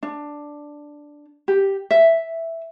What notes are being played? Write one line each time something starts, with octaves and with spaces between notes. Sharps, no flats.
D4
G4
E5